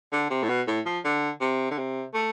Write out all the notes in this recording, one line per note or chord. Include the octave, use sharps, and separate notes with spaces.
D3
C3
A2
B2
A2
F3
D3
C3
D3
C3
A3